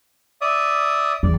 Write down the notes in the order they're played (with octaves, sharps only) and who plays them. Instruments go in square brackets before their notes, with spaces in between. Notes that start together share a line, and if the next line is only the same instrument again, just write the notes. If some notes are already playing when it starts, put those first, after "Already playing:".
[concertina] D5 E5 D#6
[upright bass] E2 [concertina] D5